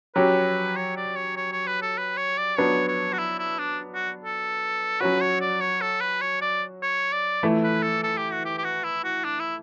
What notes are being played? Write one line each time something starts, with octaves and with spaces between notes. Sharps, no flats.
F#3 C#4 G4 B4
C#5
D5
C#5
C#5
C#5
B4
A4
B4
C#5
D5
F#3 B3 D4 C#5
C#5
F#4
E4
E4
D4
F#4
A4
F#3 C#4 F#4 B4
C#5
D5
C#5
A4
B4
C#5
D5
C#5
D5
E3 A3 E4
B4
A4
A4
G4
F#4
G4
G4
F#4
E4
F#4
D4
E4